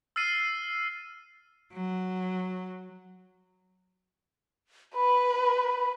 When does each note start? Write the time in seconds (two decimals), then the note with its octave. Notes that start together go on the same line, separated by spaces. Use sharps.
0.16 E6 F6 A6 C7 D#7
1.73 F#3
4.95 B4 B5